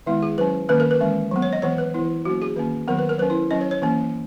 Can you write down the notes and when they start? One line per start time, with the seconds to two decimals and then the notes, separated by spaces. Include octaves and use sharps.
0.06 D#3 G#3 B3 E4
0.23 G#4
0.38 F#3 C#4 B4
0.69 D#3 A#3 C#4 B4
0.80 A#4
0.91 B4
1.00 E3 G#3 C#4
1.31 F#3 B3
1.42 C#5
1.53 D#5
1.62 E3 B3 C#5
1.78 B4
1.94 E3 B3 E4
2.25 F#3 A#3 C#4 F#4
2.42 G#4
2.56 D#3 A#3 C#4
2.88 D#3 F#3 B3 A#4
2.99 B4
3.09 A#4
3.19 F#3 C#4 B4
3.30 E4
3.51 F#3 C#4 D#5
3.61 C#5
3.71 C#5
3.82 E3 A#3 C#4